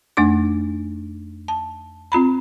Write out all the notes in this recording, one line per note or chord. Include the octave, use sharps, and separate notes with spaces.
F2 A3 D4 D6
A5
C4 F4 A#5 B5